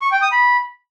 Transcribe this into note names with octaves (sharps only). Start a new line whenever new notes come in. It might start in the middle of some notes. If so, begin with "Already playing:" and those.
C#6
G5
D#6
B5